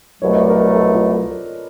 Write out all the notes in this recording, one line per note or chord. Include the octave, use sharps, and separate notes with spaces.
C2 B2 F#3 A3 C#5
D#5
D5
A#4
B4
A4
F4